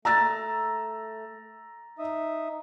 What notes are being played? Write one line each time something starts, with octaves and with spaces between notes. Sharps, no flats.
A3 A#5 E6 A6
D#4 E5 D#6